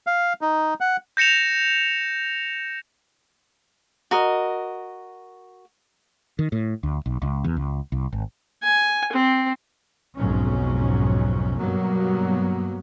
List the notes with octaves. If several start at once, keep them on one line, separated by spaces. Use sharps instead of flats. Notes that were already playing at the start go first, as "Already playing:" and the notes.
F5
D#4
F#5
G6 A#6 C#7 E7 F7
F#4 A#4 D#5
D#3
A2
D2
B1
C#2
E2
C#2
C2
G#1
G#5
C4
B1 F2 G#2 F#3 C#4
G2 B2 F#3 A#3 B3